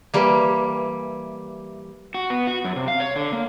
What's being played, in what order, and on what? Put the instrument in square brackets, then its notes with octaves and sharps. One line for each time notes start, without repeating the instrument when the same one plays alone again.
[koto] E3 G3 A#3
[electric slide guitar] F#4
B3
F#4
F#2
C3
F5
C#5
D3
A#3